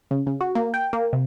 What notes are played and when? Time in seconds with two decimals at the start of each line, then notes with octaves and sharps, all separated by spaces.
0.11 C#3
0.27 C#3
0.41 F#4
0.55 A#3
0.74 G5
0.93 A#3
1.13 C3